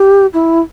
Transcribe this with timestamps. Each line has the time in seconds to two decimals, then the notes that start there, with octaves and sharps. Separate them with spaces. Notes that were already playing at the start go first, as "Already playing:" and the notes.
Already playing: G4
0.34 E4